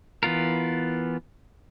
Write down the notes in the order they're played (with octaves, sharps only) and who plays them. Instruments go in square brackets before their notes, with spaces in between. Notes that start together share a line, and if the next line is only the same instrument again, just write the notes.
[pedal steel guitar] E3 B3 F4 A#4